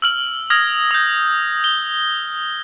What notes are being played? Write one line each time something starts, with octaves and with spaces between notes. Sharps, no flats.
E6 F6 F#7
D#6 F6 G#6 A#6
D#6 G6
G7